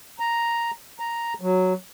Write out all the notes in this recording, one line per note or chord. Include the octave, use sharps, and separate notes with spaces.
A#5
A#5
F#3